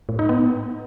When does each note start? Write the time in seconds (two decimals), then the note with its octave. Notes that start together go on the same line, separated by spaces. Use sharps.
0.09 A2
0.19 D#4
0.29 B3